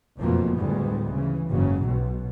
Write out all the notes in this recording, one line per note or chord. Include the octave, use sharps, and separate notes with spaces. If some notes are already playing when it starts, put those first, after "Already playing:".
F#1 F2 B2 F3 A3 A#3
D2 A2 G3 G#3 B3
C#3 E3
F#1 G#2 C#3 F#3
B1 B2